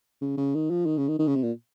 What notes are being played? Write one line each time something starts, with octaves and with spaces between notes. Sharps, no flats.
C#3
C#3
D#3
F3
D#3
C#3
D#3
D#3
C#3
C3
A#2